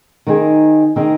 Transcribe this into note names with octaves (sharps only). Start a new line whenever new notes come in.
D#3 C4 D#4 G#4
D#3 C4 D#4 G#4